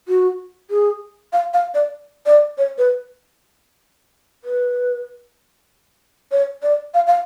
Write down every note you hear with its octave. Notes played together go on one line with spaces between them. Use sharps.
F#4
G#4
F5
F5
D5
D5
C#5
B4
B4
C#5
D5
F5
F5